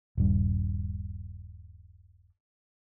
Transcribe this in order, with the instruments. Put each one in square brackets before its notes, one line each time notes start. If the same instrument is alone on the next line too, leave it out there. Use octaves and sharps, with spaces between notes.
[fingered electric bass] D#1 G2